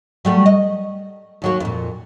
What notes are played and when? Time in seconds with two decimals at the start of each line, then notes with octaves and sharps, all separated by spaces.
0.25 F#3 G3 A3
0.46 D#5
1.42 D#2 F#3 A#3
1.60 F2 A#2